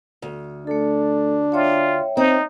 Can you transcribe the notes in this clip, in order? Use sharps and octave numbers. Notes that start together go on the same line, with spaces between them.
D2
A3 D4 A4
F4 C#5 E5 G5
C4 D#4